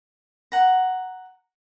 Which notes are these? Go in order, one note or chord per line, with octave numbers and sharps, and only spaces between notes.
F#5 A#5